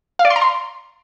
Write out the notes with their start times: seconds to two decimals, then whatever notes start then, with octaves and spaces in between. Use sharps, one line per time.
0.19 F5
0.25 D5
0.30 C6
0.36 A#5
0.41 C6